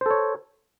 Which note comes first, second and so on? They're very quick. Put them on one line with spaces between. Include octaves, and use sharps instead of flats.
C5 A4 C#5